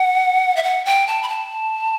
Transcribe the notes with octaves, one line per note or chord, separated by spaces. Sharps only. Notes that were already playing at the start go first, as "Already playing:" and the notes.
Already playing: F#5
E5
F#5
G5
A5
B5
A5